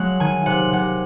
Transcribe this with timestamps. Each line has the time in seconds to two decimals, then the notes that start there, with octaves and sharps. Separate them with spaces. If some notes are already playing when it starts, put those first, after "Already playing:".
Already playing: F#3 G#3 F#5
0.20 D#3 G#5
0.46 C3 F#5
0.73 C3 F#5